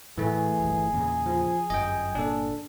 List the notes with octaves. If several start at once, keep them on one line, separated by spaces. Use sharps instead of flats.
A2 E3 A3 G#4
D1 G1
E2 A#2 C#3
F3
G1 F#2 D#5 G5
G1 A#2 D4 A4